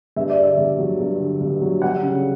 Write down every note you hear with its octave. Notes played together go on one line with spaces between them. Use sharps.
G2 E5
D5
D3
E5
G2
F#3
G2
D3
G2
F#3
G3 F#5
C#3